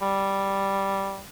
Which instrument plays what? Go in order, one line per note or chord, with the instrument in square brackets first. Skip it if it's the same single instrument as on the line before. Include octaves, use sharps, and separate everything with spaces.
[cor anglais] G3